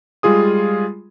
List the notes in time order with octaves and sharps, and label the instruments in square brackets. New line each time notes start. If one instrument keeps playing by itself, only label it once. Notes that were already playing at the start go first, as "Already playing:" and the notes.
[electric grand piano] G3 G#3 F4 G#4 D#6